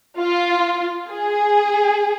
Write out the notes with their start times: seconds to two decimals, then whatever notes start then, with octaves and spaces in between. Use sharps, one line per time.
0.21 F4
1.09 G#4